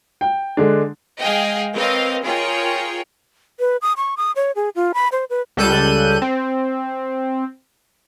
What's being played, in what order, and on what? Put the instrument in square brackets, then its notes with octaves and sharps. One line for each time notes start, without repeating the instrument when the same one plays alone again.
[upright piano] G5
D3 G#3 D4
[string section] G#3 G#4 D#5 F5 G5
C4 A#4 B4 C#5 D#5 F5
F4 G#4 A#4 C#5 G5
[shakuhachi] B4
D#6
C#6
D#6
C#5
G#4
F4
B5
C5
B4
[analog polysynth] C#2 G3 A4 F#6 G6 D#7
C4